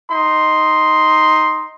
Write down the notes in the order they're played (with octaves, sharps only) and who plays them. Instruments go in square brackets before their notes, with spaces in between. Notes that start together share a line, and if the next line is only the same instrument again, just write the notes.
[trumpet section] D#4 C6